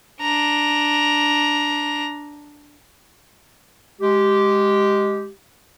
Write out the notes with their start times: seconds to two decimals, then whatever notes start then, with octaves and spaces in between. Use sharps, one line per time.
0.22 D4 A#5
4.01 G#3 G4